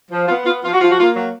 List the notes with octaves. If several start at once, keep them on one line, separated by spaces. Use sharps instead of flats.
F3
B3 F4
B3 F4
F3 F4
F#4
F3 F4
F#4
A#3 F4
F#3